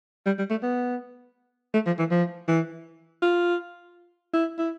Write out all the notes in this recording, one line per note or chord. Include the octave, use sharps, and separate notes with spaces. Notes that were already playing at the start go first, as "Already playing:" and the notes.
G3
G3
A3
B3
A3
F3
E3
F3
E3
F4
E4
E4